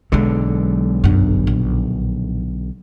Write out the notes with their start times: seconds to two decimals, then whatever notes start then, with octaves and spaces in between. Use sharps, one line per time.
0.12 B1 D3 F#3 G#3
1.04 G1 F#2
1.47 A#1